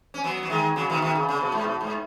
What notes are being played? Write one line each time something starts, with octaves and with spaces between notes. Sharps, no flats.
C#4
F#3 B3
F#3
D#3 G#3
C#3 F#3
B2 D#3
B2 D#3
C#3
C#3
B2
G#2
B2
G#2